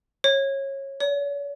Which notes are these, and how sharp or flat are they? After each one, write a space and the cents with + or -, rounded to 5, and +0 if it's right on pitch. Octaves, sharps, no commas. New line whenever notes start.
C#5 -20
C#5 +45